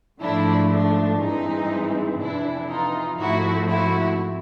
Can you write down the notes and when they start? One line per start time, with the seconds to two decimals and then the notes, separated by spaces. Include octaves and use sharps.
0.21 G#2 F3 A3 D4 E4
0.70 D4
1.20 G2 E3 G#3 C4 D#4
2.20 F2 C3 E3 D4 E4
2.70 D#4 F4
3.19 G#2 F3 A3 C4 E4 F#4
3.69 E4 F#4